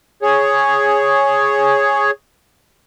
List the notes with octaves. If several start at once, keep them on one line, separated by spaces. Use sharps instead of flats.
G#4 C#5